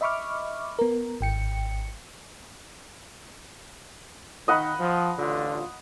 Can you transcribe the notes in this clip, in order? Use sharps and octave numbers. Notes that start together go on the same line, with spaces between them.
D#5 E5 B5 C#6 D6 F6
B3 A#4
G#1 G5 C#7
D#3 D#5 F#5 B5
F3
A1 D3 F4